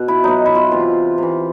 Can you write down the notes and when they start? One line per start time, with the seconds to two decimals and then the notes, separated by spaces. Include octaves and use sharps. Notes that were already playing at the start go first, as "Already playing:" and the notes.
Already playing: B2
0.08 E4
0.24 B2 F#3 D#4
0.46 E4
0.55 F4
0.71 C3 E3 F4
1.18 C3 E3